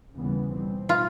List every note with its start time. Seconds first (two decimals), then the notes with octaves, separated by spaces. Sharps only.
0.16 D#2 C#3 E3 G3 B3
0.53 B2 G3 C4
0.89 F4